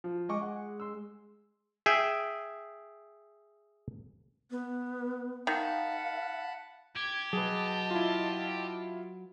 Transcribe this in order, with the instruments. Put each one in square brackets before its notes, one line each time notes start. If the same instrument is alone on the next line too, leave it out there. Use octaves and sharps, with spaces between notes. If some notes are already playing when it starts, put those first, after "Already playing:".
[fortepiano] F3
[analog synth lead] G#3 [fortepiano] D#5 C#6 D6
[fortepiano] F#5
C6 E6
[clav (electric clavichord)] G#4 E5 G5
[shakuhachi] B3
[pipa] D#3 [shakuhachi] F5 [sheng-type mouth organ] F#5 A5 B5
[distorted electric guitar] G4 [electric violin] G#6
[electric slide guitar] F#3 B4 [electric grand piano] G#4 [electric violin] D#5 A5
[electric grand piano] E4 F4